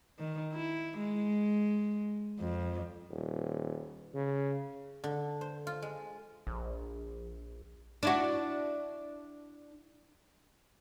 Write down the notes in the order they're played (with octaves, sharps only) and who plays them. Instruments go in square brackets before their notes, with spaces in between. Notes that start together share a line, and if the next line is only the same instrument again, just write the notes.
[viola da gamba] D#3
E4
G#3
F2
[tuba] D#1
C#3
[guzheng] D3
C5
F4
G#3
[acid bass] A#1
[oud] D4 E4 F#4